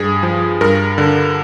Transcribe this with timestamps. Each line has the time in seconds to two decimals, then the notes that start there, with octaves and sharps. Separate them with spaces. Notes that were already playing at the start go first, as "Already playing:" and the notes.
Already playing: G2 G#4
0.23 F3
0.61 G2 A#4
0.98 D3